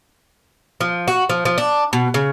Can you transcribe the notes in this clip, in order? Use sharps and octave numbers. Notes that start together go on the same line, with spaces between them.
F3
F#4
F3
F3
D4
B2
C#3